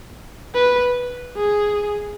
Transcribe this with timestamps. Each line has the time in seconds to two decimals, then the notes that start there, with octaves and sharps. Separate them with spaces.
0.54 B4
1.36 G#4